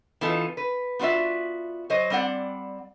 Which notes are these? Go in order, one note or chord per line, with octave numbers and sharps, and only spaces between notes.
E3 B3 D#4 F4 A4
B4
B3 F4 F#4 D5 E5
F#3 C5 C#5 D#5
G3 C4 D5 F#5